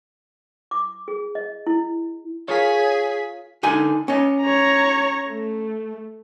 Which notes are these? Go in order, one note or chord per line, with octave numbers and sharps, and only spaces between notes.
D6
G#4
D#5
E4
F4 G#4 A#4 C#5 F5 B6
D3 D#4 G#5
C#4 D#5
C#5 A#5
A3